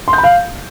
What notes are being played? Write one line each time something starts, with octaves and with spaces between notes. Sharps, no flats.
C6
G6
B5
F5